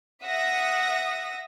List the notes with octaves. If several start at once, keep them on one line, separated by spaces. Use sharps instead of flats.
E5 F#5 D#6 A#6